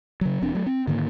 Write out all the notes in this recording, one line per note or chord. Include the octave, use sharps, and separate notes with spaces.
C#3 F#3
E1 E2 C4 D4
F#3 A3
C4
G#2 D3 D#3 A#3